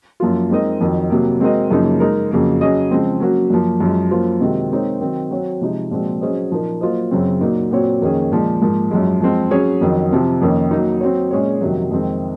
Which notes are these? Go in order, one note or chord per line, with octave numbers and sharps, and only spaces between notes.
F#2 F3 A#3 F4
G#3 C4 D#4 A#4 D#5
F2 D#3 F#3
C3 F#3 A#3
G#3 C4 F#4 A#4 D#5
F#2 C#3 F3 A#3 D#4
G#3 D#4 A#4
F2 C#3 F#3 A#3
F#3 C#4 G#4 D#5
C#3 F3 G#3 C4
F#3 A#3 C#4 F#4
F#2 F3 A#3
F#2 F3 G#3
F#2 F3 A#3 F4 C5
C3 D#3 G#3 C4 F#4
G#3 C4 D#4 A#4 C#5
D#3 F#3 C4
F#3 C4 F#4 C#5
C3 F3 G#3 D#4
A#2 F3 G#3 C4 F#4
F#3 C#4 G#4 C5 D#5
A#2 F3 A#3 D#4 A#4
F#3 A#3 F4 C5 D#5
F#2 C#3 F#3 C4
A#2 F#3 A#3 D#4
A#2 F#3 C4 F#4 C#5
F2 D#3 A#3 C#4 G#4
A#2 F3 G#3
G#2 F3 A#3
F#2 F3 G#3
F3 G#3 C4
F#3 C#4 G#4 C#5
F2 D#3 F#3
C3 F3 C4
F2 D#3 A#3 C#4
F#3 A#3 D#4
F#3 C4 F#4 C#5
A#2 G#3 C#4 G#4 C#5
F2 C3 D#3 F#3
F2 D#3 G#3 C4